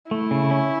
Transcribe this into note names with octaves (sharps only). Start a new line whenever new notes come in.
A3 E4
C#3
C#4